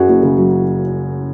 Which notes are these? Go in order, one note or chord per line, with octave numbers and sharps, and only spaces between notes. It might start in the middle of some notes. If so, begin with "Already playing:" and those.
Already playing: F#2 F#3 F#4 G#4
F#1 E4
C#3
F#3